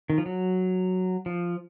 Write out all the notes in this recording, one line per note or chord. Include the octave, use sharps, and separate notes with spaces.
D#3
F3
F#3
F3